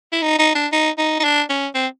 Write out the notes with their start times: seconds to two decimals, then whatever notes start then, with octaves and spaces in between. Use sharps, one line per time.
0.12 E4
0.22 D#4
0.39 D#4
0.55 D4
0.72 D#4
0.98 D#4
1.20 D#4
1.24 D4
1.50 C#4
1.75 C4